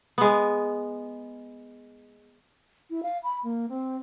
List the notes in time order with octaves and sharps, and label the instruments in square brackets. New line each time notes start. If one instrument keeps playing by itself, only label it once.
[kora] G#3 B3
[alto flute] E4
F5
B5
A#3
C4